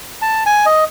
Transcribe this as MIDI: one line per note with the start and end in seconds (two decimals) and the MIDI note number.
0.22 0.44 81
0.46 0.66 80
0.66 0.84 75